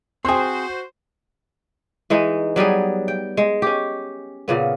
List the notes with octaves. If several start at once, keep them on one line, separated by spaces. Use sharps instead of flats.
C4 F#4 G#4 C5 G5 C6
E3 G#3 D#4
F#3 G3 B3 G#4
G5
G#3
C#4 G4
A#2 C#3 B3